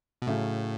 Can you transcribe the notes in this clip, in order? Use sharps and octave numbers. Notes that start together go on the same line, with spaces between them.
B2
A2 C#3 F#3 A3